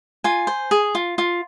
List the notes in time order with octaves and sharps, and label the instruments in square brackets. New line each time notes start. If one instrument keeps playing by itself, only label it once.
[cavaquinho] F4 G#5
C5
G#4
F4
F4